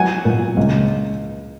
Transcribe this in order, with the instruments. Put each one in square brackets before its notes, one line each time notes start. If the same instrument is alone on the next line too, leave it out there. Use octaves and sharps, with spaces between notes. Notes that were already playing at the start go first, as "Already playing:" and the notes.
Already playing: [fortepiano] F#3 F#5 G#5
A#2
C#2